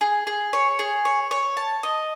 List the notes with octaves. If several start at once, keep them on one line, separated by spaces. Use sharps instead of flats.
G#4
G#4
C#5
G#4
C#5
C#5
A5
D#5